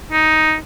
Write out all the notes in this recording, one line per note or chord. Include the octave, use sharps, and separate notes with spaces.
D#4